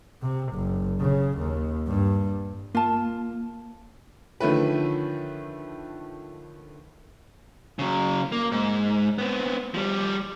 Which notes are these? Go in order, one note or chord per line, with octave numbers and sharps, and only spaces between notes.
C3
F#1
C#3
D#2
G2
A#3 F4 A5
D3 D#3 F3 A3 C#4 B4
C#3 F#3
A#3
G#2
B3 C4
F3 G3